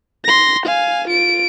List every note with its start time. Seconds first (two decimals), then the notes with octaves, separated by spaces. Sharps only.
0.25 C6 A#6
0.66 F5 G#5
1.08 F4 D7